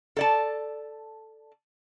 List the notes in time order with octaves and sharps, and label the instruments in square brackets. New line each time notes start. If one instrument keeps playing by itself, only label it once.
[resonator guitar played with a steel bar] A4 D5 A5